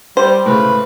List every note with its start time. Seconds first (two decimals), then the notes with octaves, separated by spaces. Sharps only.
0.17 G3 C5
0.46 A2 C#3 B4